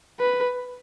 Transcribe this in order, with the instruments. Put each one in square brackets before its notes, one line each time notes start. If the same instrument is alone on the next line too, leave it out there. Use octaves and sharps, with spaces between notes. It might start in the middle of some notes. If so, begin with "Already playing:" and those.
[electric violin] B4